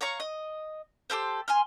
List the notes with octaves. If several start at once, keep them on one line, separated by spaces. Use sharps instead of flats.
C#5 F5 A#5 C#6
D#5
G4 A4 A#4 C5
G#5 C6 F6